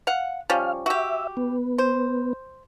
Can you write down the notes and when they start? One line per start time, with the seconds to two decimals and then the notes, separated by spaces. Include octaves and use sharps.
0.07 F5 F#5
0.50 F3 G3 C#4 F5
0.86 F#4 G4 E5
1.37 B3
1.78 C5